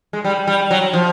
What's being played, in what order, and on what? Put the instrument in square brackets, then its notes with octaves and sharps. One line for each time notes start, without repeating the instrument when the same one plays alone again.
[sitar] G#3
G3
G3
F#3
F3